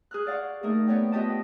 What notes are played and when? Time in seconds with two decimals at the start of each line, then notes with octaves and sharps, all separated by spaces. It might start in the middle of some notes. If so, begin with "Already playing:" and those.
0.11 G#4 F6 F#6
0.27 D5 F5 F#5 C#6
0.63 A3 A#3 D#4 G#4 A#4
0.87 B3 C#5 D5 G5
1.12 B3 F4 G4 D#5 G5 A5
1.28 B4